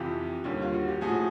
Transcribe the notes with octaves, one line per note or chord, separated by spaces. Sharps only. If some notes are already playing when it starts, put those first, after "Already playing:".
Already playing: F2 C3 E3 F4 G4
D#2 D3 G3
F4
F#4
G4
A2 F3 F#4 G#4